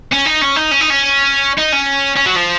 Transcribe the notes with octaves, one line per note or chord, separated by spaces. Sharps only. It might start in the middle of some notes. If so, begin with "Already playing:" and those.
C#4
D#4
C#4
D#4
C#4
D#4
C#4
D#4
C#4
C#4
F#3
F3